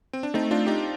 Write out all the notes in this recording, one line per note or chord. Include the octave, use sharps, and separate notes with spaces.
C4
D4
A3 C4 D#4
D4 F4
D#4 G4